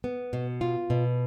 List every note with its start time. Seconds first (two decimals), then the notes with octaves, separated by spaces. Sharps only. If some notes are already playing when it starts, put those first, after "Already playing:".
0.04 B3
0.33 B2
0.61 F4
0.90 B2